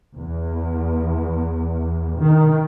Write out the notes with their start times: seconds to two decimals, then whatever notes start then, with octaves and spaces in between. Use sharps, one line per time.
0.16 E2
2.19 D#3